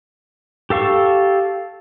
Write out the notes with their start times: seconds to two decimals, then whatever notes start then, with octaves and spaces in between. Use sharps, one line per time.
0.70 G4 A4 F5 C#6